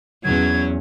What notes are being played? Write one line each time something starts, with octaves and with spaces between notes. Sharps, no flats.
E2 F#3 C#4 G#6